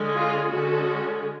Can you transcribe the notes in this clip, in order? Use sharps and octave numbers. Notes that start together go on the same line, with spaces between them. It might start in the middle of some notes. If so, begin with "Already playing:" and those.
Already playing: D3 G#3 C#4
F4 G#4
D3 G#3 C#4 F#4 A4